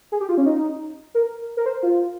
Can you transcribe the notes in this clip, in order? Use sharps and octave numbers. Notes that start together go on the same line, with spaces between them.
G#4
G4
F4
C#4
D#4
A#4
A#4
C5
F4